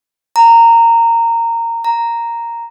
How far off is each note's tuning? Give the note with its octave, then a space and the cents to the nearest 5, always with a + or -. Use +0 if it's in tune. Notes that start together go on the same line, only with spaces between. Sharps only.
A#5 -15
A#5 -5